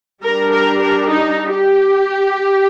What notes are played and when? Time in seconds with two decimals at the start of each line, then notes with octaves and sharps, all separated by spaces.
0.23 G3 D4 A#4
0.51 A#4
0.80 A#4
1.09 D#4
1.53 G4